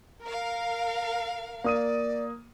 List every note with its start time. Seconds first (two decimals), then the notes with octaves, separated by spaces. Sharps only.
0.24 A#4 F5
1.64 A#3 D5 D#6 D#7